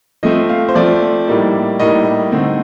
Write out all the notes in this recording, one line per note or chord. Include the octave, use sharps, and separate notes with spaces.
F3 A3 C4 D#5
F5
C5
F3 A3 C4 D5
A2 G3 A#3 D#4
A2 G3 A#3 D#4 D#5
D3 A3 C4 D#4